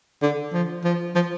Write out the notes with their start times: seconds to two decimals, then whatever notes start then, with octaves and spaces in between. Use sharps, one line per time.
0.22 D3
0.53 F3
0.84 F3
1.15 F3